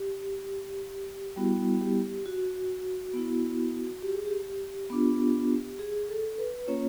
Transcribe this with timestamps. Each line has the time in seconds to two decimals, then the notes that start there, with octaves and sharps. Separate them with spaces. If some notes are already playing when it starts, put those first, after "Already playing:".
Already playing: G4
1.36 G3 B3 E4 F#4
1.81 G4
2.26 F#4
3.14 B3 E4
4.02 G4
4.15 G#4
4.26 G4
4.90 B3 D4 F4
5.79 G#4
6.08 A4
6.38 B4
6.67 A#3 C#4 F4 C#5